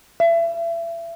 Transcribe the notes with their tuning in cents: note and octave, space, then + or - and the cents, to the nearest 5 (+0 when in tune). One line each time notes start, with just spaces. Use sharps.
E5 +30